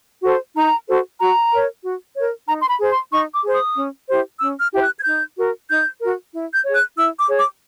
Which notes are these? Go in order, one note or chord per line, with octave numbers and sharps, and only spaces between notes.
F#4 A4 C5
D#4 A#5
F#4 A4 C5
F#4 A#5
A#4 C#5
F#4
A#4 C#5
D#4 A#5
C6
B5
G#4 C5
C6
D#4 C#6
D6
G#4 C5
D#6
C#4
E4 G4 C5
C#4 E6
F6
E4 G4 C5
F#6
G#6
D#4 G6
F#4 A#4
D#4 G6
F#4 A#4
E4
G6
G#4 C#5
F#6
E4 E6
D6
G#4 C#5
D6